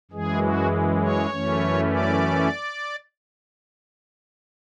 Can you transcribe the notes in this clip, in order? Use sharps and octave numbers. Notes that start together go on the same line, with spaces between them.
F#2 E3 G#3 G#4
F#4
C#5
F#2 E3 A3 C#4
D5